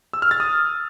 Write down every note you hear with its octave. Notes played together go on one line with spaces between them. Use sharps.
E6
F6
A6
D#6